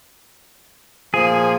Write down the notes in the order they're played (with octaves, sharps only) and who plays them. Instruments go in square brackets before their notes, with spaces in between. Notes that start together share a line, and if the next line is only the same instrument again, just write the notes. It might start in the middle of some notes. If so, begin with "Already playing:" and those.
[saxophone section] A#2 F3 [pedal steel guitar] G#4